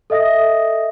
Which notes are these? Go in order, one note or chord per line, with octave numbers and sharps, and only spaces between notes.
A4 D#5 E5 D#6 A#6